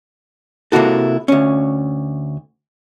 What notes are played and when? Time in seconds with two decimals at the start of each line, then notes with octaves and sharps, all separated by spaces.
0.72 C3 A#3 E4 F#4 A4
1.28 D2 C#4